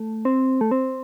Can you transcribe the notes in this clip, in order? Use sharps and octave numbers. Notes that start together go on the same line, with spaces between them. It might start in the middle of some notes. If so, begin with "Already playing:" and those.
Already playing: A3
C4
A3
C4